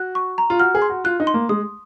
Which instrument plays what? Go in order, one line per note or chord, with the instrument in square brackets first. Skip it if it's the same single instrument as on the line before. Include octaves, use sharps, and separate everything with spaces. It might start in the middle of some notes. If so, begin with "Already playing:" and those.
Already playing: [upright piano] F#4 [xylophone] F#6
[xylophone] C#6
A#5
[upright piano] F4
[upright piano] F#4 [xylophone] F6
[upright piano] G#4
[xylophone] C6
[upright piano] F#4
[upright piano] F4 [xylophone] F#6
[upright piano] D#4
[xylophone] C6
[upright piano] A#3
[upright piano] G#3 [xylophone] D#6